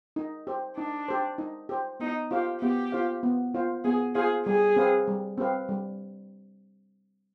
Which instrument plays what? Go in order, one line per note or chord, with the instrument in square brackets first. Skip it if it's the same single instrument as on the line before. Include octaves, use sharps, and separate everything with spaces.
[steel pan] D#4
G4 C5
[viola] D4 [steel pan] D#4
[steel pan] G4 C5
D#4
G4 C5
[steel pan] B3 [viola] D#4
[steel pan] F4 C5 F5 [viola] G4
[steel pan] B3 [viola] G4
[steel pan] F4 C5 F5
B3
F4 C5 F5
[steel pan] B3 [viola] G#4
[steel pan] F4 C5 F5 [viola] G#4
[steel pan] G3 [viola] G#4
[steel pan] C4 G4 B4 F5
G3
C4 G4 B4 F5
G3